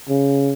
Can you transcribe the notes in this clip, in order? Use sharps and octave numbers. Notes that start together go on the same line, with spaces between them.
C#3